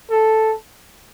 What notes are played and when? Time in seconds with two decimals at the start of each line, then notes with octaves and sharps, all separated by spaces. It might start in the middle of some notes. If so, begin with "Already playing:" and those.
0.10 A4